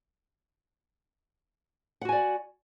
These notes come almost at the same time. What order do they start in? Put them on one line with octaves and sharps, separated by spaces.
F#5 F#4 G#5 D5